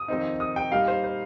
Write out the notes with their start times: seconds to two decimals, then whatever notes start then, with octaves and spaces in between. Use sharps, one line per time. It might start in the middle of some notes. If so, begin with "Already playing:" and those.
Already playing: D#6
0.08 F2 D#3 C4 D#4
0.40 D#6
0.56 G5
0.72 A#2 G3 D#4 F5
0.88 C5
1.04 C5